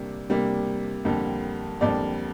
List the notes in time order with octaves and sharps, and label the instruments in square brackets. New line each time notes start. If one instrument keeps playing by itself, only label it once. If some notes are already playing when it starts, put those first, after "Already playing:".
Already playing: [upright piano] C3 G3 A#3 D4
C3 G3 A#3 D4
F2 D3 G3 A#3
F2 D3 G3 A#3 D5